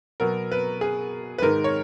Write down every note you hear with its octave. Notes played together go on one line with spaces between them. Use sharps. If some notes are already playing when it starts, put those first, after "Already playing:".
B2 F#3 B3 A#4
B4
G#4
B4
G#2 D#3 G#3 A#4
C#5